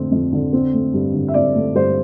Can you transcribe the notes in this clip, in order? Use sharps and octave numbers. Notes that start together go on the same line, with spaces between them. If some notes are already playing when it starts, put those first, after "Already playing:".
Already playing: F2 D3 A3 C4
F2
D3
C4
A3
G2
D3
E5
C4 D5
A3
G2 C5